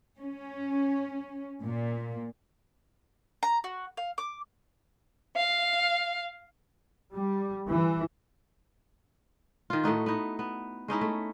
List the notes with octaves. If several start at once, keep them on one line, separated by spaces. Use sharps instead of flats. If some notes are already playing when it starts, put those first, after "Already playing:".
C#4
A#2
A#5
F#4
F5
D6
F5
G3
E3
D#3 F4
A2 A3 D#4 F#4
B3 D#4
B3
G#3 C#4 D#4 E4
A3